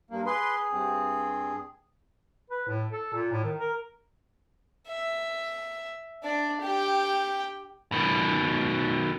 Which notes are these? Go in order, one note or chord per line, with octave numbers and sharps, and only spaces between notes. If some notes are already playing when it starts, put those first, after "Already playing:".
G2 A#3
G#4 B4 C6
G2 C4
B4
A2
A4
A#2
A2
D#3
A#4
E5
D4 D5
G4 G5
B2 D#3